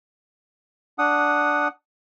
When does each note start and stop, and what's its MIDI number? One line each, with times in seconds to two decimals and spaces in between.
0.99 1.68 62
0.99 1.68 78
0.99 1.68 87